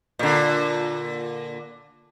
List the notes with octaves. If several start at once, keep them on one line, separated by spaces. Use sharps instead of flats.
A#2 D3